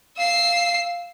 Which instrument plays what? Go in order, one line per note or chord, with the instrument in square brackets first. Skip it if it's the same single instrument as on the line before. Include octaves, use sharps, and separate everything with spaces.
[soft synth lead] F5 [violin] E6 C7